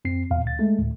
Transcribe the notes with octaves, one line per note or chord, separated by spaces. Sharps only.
F2 C4 C7
E2 A#2 F5
D2 A6
G#3 A3
D2 A2